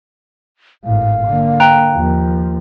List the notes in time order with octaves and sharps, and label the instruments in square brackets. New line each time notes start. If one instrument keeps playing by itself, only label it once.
[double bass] G#1 A2 [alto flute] F5
[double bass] D3 A#3
[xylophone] G5 A#5 F#6
[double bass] D#2 F3